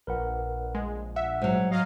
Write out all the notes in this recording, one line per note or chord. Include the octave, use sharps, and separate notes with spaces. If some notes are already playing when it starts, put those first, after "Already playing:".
A#1 A#4 B4 F#5
G#3
E5 F#5
G#2 F#3
F#3 D#5 F5